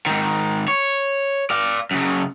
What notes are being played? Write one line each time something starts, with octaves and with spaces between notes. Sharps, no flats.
G#2 D#3
C#5
D5 F5
F#2 C#3